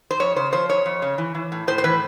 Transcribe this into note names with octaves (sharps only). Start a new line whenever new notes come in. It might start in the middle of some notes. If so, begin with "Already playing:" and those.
C5
F2 C#5
C#3 C5
F3 C5
F2 C#5
F2
C#3
E3
E3
A2
A2 C5
C5
E3 B4